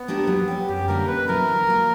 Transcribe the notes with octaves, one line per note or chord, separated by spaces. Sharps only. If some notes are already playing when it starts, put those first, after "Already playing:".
Already playing: B3
A#3 D4 G4 A#4
F#3
C#4 G4
F#2 G4
D3 G3 A#3 C#4 A#4
B2 B4
F#3 B3 E4 A#4
D3
F#3 A#3